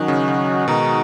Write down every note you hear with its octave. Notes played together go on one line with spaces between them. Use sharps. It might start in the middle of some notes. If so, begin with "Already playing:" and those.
Already playing: D#3 F#3 C#4 F#4 D#5
C#3
C#3
B2 D#3 G#3 D#4 F#4